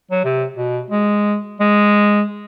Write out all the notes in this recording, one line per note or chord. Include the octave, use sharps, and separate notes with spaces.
F#3
C3
B2
G#3
G#3